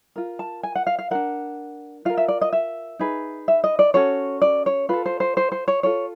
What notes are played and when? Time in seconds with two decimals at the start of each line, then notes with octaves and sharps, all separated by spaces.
0.16 F4 A#4
0.39 A5
0.63 G#5
0.75 F#5
0.87 F5
0.99 F5
1.11 D4 F#4 A#4 F#5
2.05 F4 A#4 F5
2.18 E5
2.28 D5
2.41 D#5
2.53 E5
2.99 D#4 G#4 B4
3.48 E5
3.64 D#5
3.79 D5
3.94 C#4 F#4 A4 C#5
4.42 D5
4.66 C#5
4.89 F4 A4 B4
5.06 C5
5.20 C5
5.37 C5
5.52 C5
5.68 C#5
5.83 F4 A4 C#5